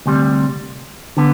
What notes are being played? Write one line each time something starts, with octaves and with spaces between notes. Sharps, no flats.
D2 C3 G3
D3 B3